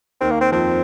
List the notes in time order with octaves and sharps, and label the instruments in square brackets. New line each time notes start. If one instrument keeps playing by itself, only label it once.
[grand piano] D#2 D#3 [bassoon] C4
[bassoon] A#3
C4
[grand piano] F2 F3 [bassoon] C4